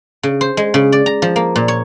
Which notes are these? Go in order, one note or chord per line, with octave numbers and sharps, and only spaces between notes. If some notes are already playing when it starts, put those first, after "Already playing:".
C#3
C5
G#3
C#3
D5
A#5
F3
A#3
A#2
C#5